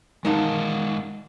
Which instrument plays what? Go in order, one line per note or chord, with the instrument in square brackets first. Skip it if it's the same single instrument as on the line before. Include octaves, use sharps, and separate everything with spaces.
[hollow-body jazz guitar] D#3 D#4 A5 [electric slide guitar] G#3 F5 F#5